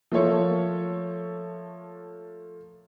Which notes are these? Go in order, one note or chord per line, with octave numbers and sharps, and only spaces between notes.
F3 A3 A#3 A4 C#5